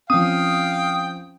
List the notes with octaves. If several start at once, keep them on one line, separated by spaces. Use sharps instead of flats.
F3 C4 C#4 F5 G5 D#6